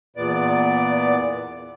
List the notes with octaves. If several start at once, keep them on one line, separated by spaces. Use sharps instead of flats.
E2 A#2 B3 D5